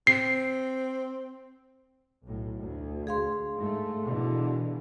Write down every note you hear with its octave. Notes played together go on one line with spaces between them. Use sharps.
C4 C7
B1 A2
D2
G#4 F5 C6
G#2 A3
B2 D3 E3